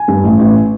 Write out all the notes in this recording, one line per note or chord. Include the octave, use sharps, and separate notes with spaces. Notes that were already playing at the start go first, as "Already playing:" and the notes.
Already playing: G#5
G2
A1
A1